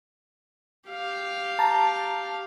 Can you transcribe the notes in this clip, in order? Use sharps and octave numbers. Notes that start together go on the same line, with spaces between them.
G4 F5
A5 A#5